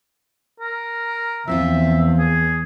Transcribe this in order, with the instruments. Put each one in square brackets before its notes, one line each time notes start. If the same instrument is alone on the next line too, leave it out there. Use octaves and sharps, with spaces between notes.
[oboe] A#4
[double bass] E2 [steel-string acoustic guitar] F3 C4 F4 [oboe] E5
[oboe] G#4